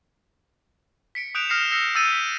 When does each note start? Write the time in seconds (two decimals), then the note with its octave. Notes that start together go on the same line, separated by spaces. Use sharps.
1.15 B6 C#7 D7
1.35 D#6 F#6 G6 D7 E7 F7
1.49 D#6 F6 A#6 C7 C#7 E7
1.71 E6 G6 A#6 C7 C#7
1.95 D#6 E6 G6 A6 C#7 D#7
2.12 B6